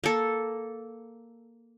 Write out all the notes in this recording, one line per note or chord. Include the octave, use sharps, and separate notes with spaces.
A#3 A4